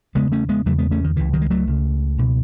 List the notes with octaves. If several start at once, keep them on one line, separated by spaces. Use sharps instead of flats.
E2 C#3 G#3 B3
A3 C#4
G#3 B3
E2 C#3 F#3 A3
G#3 B3
A3 C#4
D#3
C#2 C#3 E3
D#3 F#3
G#3
F#3 A3
C#2 C#3
C#2 B2